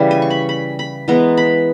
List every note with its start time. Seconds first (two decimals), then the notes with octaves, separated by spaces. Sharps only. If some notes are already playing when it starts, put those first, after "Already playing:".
Already playing: C#3 E3 G3
0.11 G#5
0.22 C#6
0.30 B5
0.49 B5
0.79 B5
1.08 E3 G#3 B3 A#5
1.37 B5